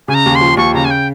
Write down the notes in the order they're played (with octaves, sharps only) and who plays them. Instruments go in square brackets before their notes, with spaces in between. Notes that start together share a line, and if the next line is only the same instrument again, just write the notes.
[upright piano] C#3 [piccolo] G#5
[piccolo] A#5
[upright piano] D#2
[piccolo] C6
[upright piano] F3
[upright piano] D#2 [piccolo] C#6
[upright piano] C#3 [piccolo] A#5
[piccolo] G#5
G5